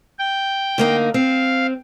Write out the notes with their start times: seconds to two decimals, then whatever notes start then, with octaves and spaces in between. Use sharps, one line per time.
0.19 G5
0.78 D3 A#3 D#4
1.14 C4 F5